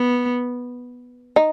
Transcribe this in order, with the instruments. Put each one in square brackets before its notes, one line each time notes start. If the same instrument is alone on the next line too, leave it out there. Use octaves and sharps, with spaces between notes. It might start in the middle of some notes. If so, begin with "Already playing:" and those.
Already playing: [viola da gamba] B3
[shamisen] D#4